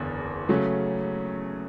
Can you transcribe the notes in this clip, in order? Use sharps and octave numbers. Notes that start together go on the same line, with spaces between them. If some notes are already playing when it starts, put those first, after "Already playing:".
Already playing: F#1 E2 D3
C#3 F#3 A3 C#4